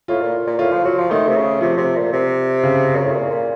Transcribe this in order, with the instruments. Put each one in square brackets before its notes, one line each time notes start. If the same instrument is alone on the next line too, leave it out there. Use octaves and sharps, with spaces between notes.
[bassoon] A2 [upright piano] F4
[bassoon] A#2
A#2
[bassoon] A2 [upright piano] F4
[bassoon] F3
F#3
F3
[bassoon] D#3 [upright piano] A3
[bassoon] C3
C#3
[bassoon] C3 [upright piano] F3
[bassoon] C3
A#2
C3
[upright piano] C#3
[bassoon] F#2
A2
A#2
A#2